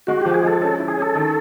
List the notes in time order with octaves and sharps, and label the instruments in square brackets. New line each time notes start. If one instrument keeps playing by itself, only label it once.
[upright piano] G#3 [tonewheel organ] F#4
[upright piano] F3 [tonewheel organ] G4
[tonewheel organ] G#4
[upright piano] G#3 [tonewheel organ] A4
[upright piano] C#4 [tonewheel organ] A4
[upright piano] E4
[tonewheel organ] G#4
[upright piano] C#4 [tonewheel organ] A4
[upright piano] D#3